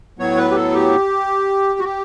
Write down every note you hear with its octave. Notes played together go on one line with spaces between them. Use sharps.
A2 F#3 B3 C#5
B4
G4
A4
G4
F#4
G4